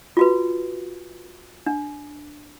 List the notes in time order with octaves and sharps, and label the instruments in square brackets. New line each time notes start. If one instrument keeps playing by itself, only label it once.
[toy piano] F4 F#4 B4
D4